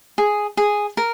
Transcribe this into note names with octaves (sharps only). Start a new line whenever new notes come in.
G#4
G#4
A#4